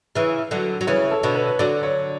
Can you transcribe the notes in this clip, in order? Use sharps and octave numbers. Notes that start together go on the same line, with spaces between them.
C#3 E3
D3 F#3
F#3
C#3 E3 C#5
A4
B2 D3
B4
D3 F#3 D5
C#5